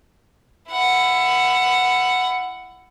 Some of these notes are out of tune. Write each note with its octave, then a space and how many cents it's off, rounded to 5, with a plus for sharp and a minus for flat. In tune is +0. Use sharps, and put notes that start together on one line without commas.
E4 +25 F#5 +0